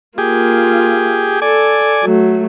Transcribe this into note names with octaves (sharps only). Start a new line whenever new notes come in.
A#3 F4 G4 G#4
A4 D5 G#5
F#3 A3